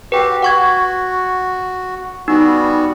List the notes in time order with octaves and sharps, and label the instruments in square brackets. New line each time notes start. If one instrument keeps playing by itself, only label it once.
[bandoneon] F#4 G4 [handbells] B4 G5
[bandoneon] F#4 [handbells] F#5 C#6 G#6
[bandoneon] G3 B3 F#4 [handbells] D#4